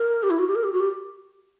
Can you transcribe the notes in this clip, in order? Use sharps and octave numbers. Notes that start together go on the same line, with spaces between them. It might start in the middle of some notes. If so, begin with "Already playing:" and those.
Already playing: A#4
G4
E4
F#4
G4
A#4
G4
F#4
G4